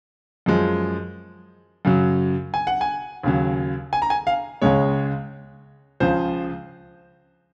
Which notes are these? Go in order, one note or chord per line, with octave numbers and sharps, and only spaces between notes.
F#2 F3 G#3
F#2 C#3 F#3
G#5
F#5
G#5
D#2 C#3 F#3
G#5
A#5
G#5
F5
C#2 C#3 G#3 C#5
C#2 C#3 F3 C5